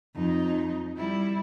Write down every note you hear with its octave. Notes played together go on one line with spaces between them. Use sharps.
F2 D#4
G3 E4